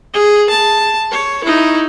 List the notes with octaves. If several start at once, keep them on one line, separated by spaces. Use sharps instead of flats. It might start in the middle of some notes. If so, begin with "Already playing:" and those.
G#4
A5
C#5
D#4 E4